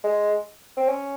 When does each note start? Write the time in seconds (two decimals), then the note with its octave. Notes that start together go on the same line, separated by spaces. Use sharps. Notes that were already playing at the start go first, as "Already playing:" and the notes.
0.04 G#3
0.77 C4
0.88 C#4